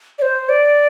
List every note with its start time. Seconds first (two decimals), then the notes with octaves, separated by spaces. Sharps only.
0.19 D5
0.22 C5
0.49 D5